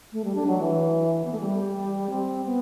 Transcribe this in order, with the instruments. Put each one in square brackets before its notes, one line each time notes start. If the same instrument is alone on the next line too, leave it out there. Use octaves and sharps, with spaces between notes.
[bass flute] A3
G3
D4
F#3
E3
B3
A3
G3
C4
B3